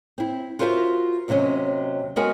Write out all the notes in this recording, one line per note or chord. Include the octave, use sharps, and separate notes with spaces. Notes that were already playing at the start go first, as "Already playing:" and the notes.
C4 E4
F4 F#4 A#4 C5 D#5 E5
D#2 C3 F#3 C#4 D#5
G#3 B3 F#4 A#4 F#5 G#5